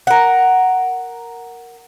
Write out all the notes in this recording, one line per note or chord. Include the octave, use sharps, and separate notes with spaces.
A#4 F#5